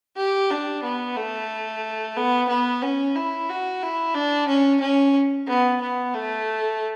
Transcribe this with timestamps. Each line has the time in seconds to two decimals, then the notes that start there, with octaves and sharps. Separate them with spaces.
0.17 G4
0.51 D4
0.83 B3
1.16 A3
2.16 B3
2.49 B3
2.82 C#4
3.15 E4
3.50 F#4
3.83 E4
4.15 D4
4.48 C#4
4.81 C#4
5.48 B3
5.81 B3
6.14 A3